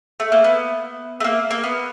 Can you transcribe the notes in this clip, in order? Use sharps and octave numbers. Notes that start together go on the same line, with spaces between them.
A3
A#3
B3
A3
A#3
A#3
B3